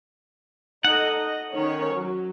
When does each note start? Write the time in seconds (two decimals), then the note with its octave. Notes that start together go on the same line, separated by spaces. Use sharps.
0.85 D#4 A4 D#5 F#5
1.19 D#5
1.53 D#3 C#4 C#5
1.96 F#3